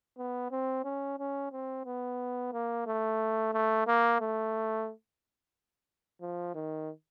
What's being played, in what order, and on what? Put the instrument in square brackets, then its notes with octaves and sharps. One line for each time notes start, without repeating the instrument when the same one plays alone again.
[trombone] B3
C4
C#4
C#4
C4
B3
A#3
A3
A3
A#3
A3
F3
D#3